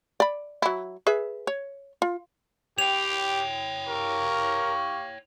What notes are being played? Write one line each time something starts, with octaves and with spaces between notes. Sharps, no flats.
D5 B5
F#3 E4
G#4 B4 E5
C#5
F4
G4 C#5 G5 F7
G4 A#4 F5 C#6